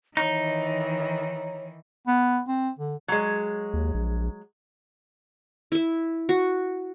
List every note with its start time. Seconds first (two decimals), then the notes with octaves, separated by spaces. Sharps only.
0.17 D#3 E3 D#4 C#5
2.07 B3
2.48 C4
2.79 D3
3.08 F#3 G#3
3.73 D#2
3.94 A#1
5.72 E4 E5
6.29 F#4